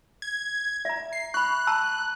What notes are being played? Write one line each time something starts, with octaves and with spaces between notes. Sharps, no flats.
G#6
E5 A#5
C7
B5 C#6 F#6
A5 A#5 E6